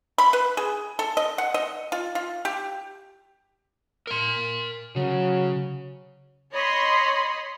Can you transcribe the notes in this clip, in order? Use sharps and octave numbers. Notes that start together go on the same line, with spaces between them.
B5
B4
G#4
A4
D#5
F#5
D#5
F4
F4
G4
A#4 C6
C#3 F#3
C#5 D#5 B5 C6